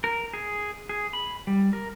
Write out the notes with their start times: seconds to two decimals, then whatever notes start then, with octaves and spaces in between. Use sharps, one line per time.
0.04 A#4
0.34 G#4
0.89 G#4
1.13 B5
1.47 G3
1.73 A#4